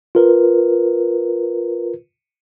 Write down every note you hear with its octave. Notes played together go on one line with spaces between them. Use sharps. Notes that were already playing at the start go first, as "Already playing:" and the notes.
F4 A#4 B4